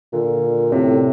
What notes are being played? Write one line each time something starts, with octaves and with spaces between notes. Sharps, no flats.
A#2 D3
A2 C3